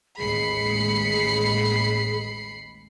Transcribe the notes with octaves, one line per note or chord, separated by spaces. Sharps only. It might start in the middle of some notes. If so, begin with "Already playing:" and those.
A1 D#2 G#3 G#4 B5 C7 C#7